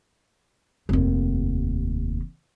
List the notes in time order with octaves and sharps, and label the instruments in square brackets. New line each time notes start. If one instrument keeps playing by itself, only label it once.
[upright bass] F1 D#2